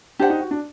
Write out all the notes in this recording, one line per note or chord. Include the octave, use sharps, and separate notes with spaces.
D4 G4 C5 F#5
D#4
F#4
D4